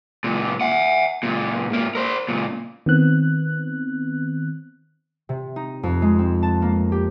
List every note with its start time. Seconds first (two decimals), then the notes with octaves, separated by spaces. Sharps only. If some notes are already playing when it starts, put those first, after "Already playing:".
0.24 C#2 A#2
0.61 E5 F#5
1.23 C#2 A#2
1.70 G#2 A#3
1.95 A#4 C5
2.28 C#2 A#2
2.86 D#3 B3 C4 F#6
5.29 C3
5.56 D#4
5.83 F2
6.02 G#3
6.19 C4
6.43 A5
6.62 A#3
6.92 G4